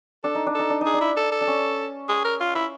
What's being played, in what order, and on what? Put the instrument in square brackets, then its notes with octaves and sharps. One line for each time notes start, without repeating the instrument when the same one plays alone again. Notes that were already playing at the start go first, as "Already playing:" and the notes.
[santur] D4 [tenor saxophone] A4
[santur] D#4
D4
[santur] D#4 [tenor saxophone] A4
[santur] D4
[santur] D#4 [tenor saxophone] G#4
[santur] D4
[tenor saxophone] E4
A4
A4
[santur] D4
C#4
[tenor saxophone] G#4
A#4
F4
E4